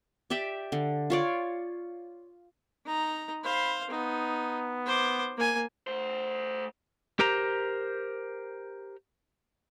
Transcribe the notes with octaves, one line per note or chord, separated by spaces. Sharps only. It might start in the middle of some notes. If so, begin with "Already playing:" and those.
G4 D5 E5 G5
D3
F4 C#5 D5
D#4 A#5
C5 F5 B5
B3 D#4
C5 D6
A#3 G#5
A3 C5
G4 A#4 C5 A#5